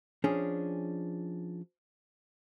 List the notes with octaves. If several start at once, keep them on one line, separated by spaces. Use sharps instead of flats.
F3 C#4 D4 G#4